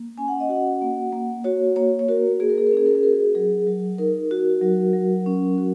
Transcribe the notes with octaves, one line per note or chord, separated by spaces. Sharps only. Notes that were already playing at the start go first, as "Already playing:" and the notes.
Already playing: A#3
C#4 G#5
F#5
D#5
F#4 F#5
A#3
A#3
F#4 C#5
A#3 C#5
C#5
F#4 A#4
A#3 G#4
A#4
G#4
A#4
C#4 G#4
A#4
G#4
F#4 A#4
G#4
F#3 G#4
F#3
D#4 A#4
F#4
F#3
F#3
C#4
F#4